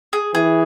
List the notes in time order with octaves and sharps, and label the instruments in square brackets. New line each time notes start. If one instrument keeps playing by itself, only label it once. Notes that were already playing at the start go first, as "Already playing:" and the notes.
[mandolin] G#4
[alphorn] E3 [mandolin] G#4